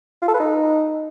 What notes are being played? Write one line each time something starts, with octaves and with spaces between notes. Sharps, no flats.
F4
A4
B4
D#4